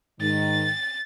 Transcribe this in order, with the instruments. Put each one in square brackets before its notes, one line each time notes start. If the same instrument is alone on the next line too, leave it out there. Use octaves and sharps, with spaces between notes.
[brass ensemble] G#2 D#3 [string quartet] A6